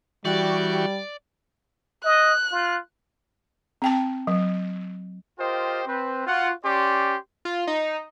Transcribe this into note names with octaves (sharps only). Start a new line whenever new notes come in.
E3 G3 F#4 G4 D5 C#6
D#5 F#6
F4
C4 G5 A5
F#3
F4 G4 A#4 C5 D#5 G5
C4 B4 C5
F4 F#4 F#5
C#4 G4 D5 C6
F4
D#4